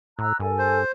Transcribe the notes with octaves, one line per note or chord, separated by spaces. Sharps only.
A2 A#5 E6 F#6
G2 A4 A#4 G#5
C5